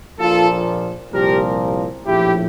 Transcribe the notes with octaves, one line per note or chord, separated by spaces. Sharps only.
A#1 A#2 F3 F4 A4
C2 A#2 F3 G4 A#4
A#1 A2 F3 E4 G4